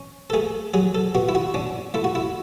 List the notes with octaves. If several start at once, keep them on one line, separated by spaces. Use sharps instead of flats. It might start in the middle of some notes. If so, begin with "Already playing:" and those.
Already playing: C#4
A4
A3 G#4
F#3 G#4
A4
B2 F#4
E4
F#4
C#4 D4
A3 E4
F#4
E4